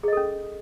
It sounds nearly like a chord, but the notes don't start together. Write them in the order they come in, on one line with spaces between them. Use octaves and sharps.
G#4 D#5 A4 C#4